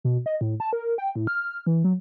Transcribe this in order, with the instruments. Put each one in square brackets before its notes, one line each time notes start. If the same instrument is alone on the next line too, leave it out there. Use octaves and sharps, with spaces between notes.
[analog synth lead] B2
D#5
A2
A5
A#4
G5
A2
F6
E3
F#3